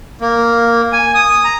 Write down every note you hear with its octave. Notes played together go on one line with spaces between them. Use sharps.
A#3
G#5
D#6
A#5